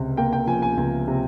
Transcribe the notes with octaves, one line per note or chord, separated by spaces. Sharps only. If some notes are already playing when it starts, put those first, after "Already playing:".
Already playing: C#2 C3
A#3 G5
G5
F3 G#5
G#5
C#2 G#5
C3